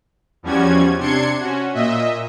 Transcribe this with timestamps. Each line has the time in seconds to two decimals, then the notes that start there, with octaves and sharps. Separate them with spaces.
0.43 E2 F3 G3 C#4 F#4 G#6
0.99 C3 D4 C6 G#6 C#7
1.39 C#4 F#4
1.74 A#2 D#5 E5